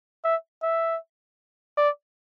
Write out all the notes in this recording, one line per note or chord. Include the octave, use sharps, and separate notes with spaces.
E5
E5
D5